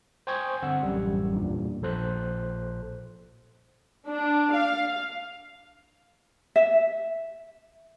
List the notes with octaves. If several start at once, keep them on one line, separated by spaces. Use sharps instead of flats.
C5 G5 G#5 C#6 D#6 G#6
G2 D3 C4 F#5 E6
A1 F#2 G3
E2 G2 A#2
A#1 A#2 A4 C5 F#6
D4
F5
E5